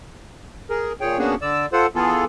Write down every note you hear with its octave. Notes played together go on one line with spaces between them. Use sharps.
G#4 A#4
A#2 G#4 C#5 G5
A#3 B3 C#4 D4 F#4 G#4
D3 D5 E6
F4 A4 C5 F#5
E3 B3 F4 G#4 A4